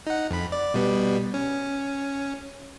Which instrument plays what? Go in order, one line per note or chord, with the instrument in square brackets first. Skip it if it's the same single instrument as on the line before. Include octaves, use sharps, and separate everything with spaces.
[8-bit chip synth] D#4 F#5
F2 B5
D5
B2 G3 B3
C#4